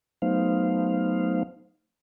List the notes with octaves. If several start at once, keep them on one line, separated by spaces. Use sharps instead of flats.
F#3 A3 B3 D#4 C5 F5